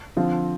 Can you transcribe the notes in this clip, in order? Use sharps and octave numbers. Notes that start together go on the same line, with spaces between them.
D3 F3 C4 F4